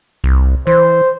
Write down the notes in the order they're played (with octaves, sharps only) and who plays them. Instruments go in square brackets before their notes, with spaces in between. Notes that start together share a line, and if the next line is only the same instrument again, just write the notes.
[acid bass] C2
[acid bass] E3 [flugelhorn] C5